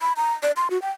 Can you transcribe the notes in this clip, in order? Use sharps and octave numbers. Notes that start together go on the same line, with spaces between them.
B5
A#5
D5
C6
F#4
G5